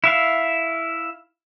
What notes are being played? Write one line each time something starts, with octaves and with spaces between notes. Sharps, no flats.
E4 E5 F5